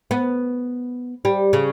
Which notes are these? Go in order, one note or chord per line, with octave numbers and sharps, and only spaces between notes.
B3
G3
C#3